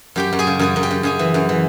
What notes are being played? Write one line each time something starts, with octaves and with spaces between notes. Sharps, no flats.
F#2 G4 G5
F#2
G#4 G#5
C#3
F#2 G#4 G#5
F#2
G4 G5
F#2
F#2 G#4 G#5
E3
F#2
E3